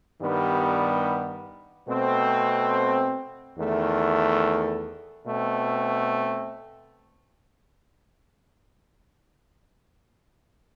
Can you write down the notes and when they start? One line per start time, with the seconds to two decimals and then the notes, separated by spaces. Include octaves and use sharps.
0.20 G2 D#3 G3 B3
1.88 B2 A3 C4
3.57 E2 D#3 A3
5.26 B2 A3 C4